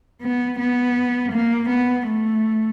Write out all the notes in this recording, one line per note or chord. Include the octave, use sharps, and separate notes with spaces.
B3
B3
A#3
B3
A3